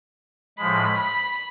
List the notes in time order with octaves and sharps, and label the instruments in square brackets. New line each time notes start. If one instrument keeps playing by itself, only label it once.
[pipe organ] A2 F3 G#3 [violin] B5
[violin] B5